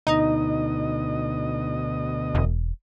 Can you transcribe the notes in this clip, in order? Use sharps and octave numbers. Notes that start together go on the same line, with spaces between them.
D2 B2 D#4 D#5
E1